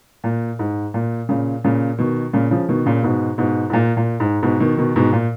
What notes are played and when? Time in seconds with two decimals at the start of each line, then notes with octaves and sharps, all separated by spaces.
0.24 A#2
0.59 G#2
0.94 A#2
1.29 A#2 C#3
1.64 A#2 C#3
1.98 B2 D#3
2.33 A#2 C#3
2.51 C#3 F3
2.68 B2 D#3
2.86 A#2 C#3
3.03 G#2 B2
3.38 G#2 B2
3.70 G#2
3.73 A#2
3.97 A#2
4.20 G#2
4.43 G#2 B2
4.60 B2 D#3
4.77 B2 D#3
4.96 G#2 B2
5.12 A#2